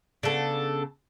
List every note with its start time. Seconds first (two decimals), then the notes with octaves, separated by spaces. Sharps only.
0.23 C#3 B3 D4 A4